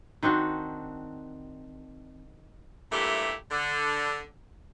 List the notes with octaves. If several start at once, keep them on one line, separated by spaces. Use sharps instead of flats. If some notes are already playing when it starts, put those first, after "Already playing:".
D#3 C4 D4 F#4
G2 A#2 A3 E4 G4
D3